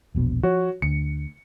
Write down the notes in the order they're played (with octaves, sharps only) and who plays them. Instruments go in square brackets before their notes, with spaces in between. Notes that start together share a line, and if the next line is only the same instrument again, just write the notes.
[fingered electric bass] E1 A#1 B2
[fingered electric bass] F3 [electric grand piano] F#4 C#5
[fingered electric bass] D2 [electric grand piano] C#7